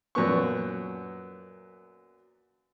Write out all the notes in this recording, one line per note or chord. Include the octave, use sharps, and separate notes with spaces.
F#2 A#2 B3 C#6